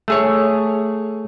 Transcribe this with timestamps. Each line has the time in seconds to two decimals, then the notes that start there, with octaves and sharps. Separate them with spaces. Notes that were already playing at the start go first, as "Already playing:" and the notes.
0.08 A3 G#4 C#5